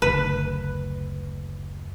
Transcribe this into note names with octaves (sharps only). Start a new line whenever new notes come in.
F#1 D2 B4